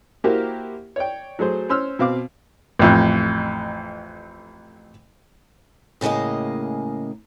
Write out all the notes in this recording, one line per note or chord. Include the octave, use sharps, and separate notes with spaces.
A#3 E4 F#4 G4 A#4 C5
C#5 D5 G5
F#3 A3 G#4 C5
C#4 C5 C6 E6 F6
B2 C4 F5 D6
A1 F2
A2 C#3 G#3 A#3 D#5